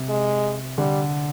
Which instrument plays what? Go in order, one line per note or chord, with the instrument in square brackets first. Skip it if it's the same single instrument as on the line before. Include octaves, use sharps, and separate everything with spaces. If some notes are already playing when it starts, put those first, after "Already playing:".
Already playing: [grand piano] C3
[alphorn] G#3
[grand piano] D3 [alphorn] G3